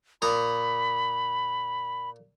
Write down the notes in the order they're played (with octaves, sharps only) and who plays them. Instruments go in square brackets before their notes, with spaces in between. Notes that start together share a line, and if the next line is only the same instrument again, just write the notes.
[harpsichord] A#2 A#5 D#6 [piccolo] B5